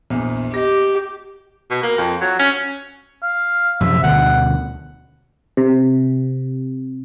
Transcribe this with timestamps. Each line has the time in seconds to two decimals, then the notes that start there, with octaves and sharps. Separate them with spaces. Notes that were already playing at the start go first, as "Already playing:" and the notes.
0.10 A#1 E2
0.54 G4 D#5 A#6
1.70 B2
1.83 A#3
1.98 F2
2.21 F#3
2.39 C#4
3.23 F5
3.80 F#2 C3 F3 E5
4.03 D2 B2 D3 F#5
5.57 C3